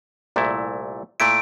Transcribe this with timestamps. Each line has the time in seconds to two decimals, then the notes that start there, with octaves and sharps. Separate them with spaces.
0.36 C2 A#2 A3 E4
1.20 A#2 A3 E4 D7